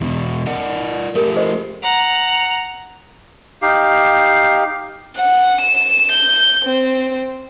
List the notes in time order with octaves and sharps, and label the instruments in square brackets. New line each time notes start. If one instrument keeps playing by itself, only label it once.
[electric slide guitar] E2 B2
A#4 D5 F#5
[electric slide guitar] A3 G4 A4 [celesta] A#4
[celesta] G#4 C5 D#5
[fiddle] F#5 A#5
[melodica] D#4 G4 F5
[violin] F#5
E7
G6
C4